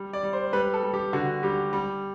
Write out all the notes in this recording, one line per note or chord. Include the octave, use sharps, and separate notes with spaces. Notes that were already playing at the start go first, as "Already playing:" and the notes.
Already playing: G3
D5
G3
C5
G3 B4
A4
G3
G4
D3 F#4
G3 G4
G3